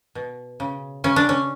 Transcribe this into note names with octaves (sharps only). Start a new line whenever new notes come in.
B2
C#3
C#3 C#4
D4
C#4